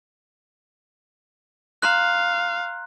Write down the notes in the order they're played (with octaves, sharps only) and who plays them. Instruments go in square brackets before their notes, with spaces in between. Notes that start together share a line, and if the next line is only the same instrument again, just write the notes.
[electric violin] F5 [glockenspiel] A#5 C6 F#6